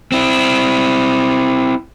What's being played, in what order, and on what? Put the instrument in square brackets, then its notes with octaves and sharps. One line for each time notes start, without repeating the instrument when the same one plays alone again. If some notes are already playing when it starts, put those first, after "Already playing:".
[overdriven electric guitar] C4 E4